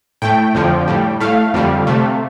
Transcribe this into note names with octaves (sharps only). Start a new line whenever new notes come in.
A2 A3 G5
F2 D3 F3
A2 G3
A2 A3 F5
F2 D3 G3
C3 A3